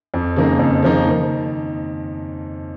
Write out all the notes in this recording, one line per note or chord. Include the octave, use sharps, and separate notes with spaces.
F2
C#3 F3 A#3 D#4
F2
C#3 F3 A#3 D#4
D#3